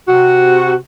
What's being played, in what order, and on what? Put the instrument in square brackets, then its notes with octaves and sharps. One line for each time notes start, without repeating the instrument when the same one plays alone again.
[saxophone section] C3 F#4